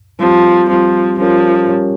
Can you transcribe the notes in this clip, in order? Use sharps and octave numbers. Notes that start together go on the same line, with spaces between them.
F3 G3 C4 G4
F3 G3 C4 G4
F3 G3 C#4 G4 A#4 C#5
G3 C#4 G4 A#4 C#5